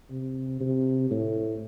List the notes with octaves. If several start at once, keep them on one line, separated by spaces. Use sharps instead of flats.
C3
C3
A2